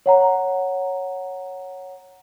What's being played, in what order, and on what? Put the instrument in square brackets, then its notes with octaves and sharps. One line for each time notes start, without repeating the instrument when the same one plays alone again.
[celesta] C#5 F#5 A#5